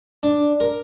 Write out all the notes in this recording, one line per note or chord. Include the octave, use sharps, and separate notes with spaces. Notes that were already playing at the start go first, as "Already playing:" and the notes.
D4
A#4